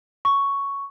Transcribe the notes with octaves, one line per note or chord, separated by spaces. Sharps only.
C#6